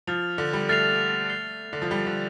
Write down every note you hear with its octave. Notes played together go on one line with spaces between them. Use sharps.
F3 F6 A6 C7 F7
D3
G3
A3 F6 A6 C7 F7
F6 C7 G7
D3
F3
G3 F6 C7 G7
D3